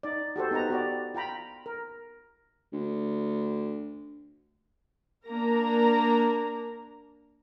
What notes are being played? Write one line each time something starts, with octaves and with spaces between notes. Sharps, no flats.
D#4 D5
F#4 G4 A4 C5
B3 D#4 G4 B4 A#5
F#4 G4 D5
F4 G5 A#5 B5
A#4
D2
A#3 D4 A#4 A#5